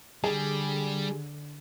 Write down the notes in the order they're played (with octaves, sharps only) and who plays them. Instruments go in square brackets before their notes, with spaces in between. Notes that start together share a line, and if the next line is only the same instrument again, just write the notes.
[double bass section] D3 [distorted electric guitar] G3 [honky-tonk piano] G#4